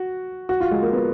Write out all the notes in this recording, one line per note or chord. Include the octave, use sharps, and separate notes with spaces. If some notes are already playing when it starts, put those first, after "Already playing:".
Already playing: F#4
F#4
F4
G#3
A#3
B3